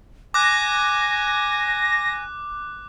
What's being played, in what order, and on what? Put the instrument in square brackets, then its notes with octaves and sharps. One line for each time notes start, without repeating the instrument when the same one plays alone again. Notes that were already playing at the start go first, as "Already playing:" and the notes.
[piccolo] G#5 [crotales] D6 F#6 [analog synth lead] A#6